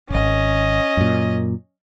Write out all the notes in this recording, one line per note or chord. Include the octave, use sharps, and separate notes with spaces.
D#1 G#1 C#4 D#5
F#2 A#2